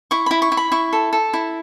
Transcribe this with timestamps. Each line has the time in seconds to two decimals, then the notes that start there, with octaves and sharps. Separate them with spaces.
0.11 E4 C#6
0.26 E4 B5
0.42 C#6
0.52 E4
0.57 B5
0.72 E4 C#6
0.93 A4
1.13 A4
1.34 E4